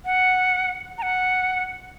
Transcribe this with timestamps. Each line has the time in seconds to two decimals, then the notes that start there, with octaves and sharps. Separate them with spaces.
0.05 F#5
0.98 A#5
1.02 F#5